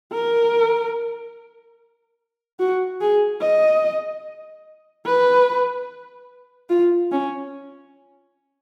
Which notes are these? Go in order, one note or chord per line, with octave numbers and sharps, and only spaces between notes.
A#4
F#4
G#4
D#5
B4
F4
C#4